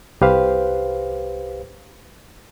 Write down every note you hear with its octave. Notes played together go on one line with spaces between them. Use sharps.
C2 G4 B4 C5 F5